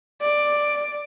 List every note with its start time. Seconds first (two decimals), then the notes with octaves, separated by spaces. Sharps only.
0.22 D5